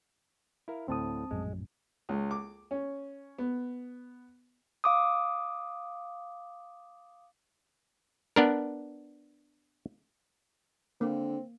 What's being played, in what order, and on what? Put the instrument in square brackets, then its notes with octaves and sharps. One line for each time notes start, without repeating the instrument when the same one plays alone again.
[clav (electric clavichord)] E4 A#4 F5
[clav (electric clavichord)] D2 A2 [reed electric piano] C4 A5 D#6
[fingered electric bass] A#1 F#2 A2 [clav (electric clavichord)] G#3
[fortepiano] C#2
D6
C#4
B3
[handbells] F5 D6 D#6
[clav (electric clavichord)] B3 D4 A#4
[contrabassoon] D3 [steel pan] A#3 [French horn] C4